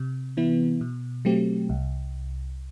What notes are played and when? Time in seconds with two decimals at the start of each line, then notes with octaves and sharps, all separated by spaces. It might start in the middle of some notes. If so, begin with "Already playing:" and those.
Already playing: C3
0.37 E3 B3 E4
0.81 B2
1.25 F#3 A3 C4 G4
1.69 C2